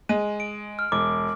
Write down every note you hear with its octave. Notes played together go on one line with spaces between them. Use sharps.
G#3 D#7
D7
F6
E1 D6